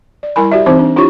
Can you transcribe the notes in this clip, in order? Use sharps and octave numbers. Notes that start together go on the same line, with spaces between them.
D5
G3 E4 A#4 G#5 B5
F#4 G4 D5 E5
E3 C4 D#4 C5 D6
D4
D4 E4 F4 G4 C#5 C#6